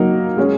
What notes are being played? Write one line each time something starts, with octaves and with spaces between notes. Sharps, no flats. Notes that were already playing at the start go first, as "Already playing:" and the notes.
Already playing: F#3 A#3 D#4 A#4
G#3 C#4 G#4